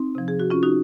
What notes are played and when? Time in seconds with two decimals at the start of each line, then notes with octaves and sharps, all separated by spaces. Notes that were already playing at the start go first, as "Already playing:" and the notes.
Already playing: C4 D#4
0.15 C3 F3
0.28 G#4
0.40 F#4
0.50 C#4 F4
0.63 D#4 F#4